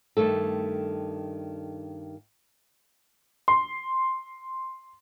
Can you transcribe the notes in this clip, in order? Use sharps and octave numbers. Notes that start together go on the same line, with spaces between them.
G2 D#3 A3 A4
C6